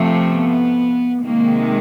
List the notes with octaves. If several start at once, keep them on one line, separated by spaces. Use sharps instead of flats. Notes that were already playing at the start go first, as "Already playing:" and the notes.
Already playing: C3 F3 A3
B3
C3 D#3 G#3 A#3